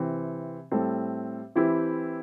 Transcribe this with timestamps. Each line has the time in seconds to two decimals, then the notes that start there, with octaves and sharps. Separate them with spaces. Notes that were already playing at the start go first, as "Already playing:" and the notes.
Already playing: C3 E3 C4
0.71 A2 G3 C4 A4
1.56 E3 C4 E4 G4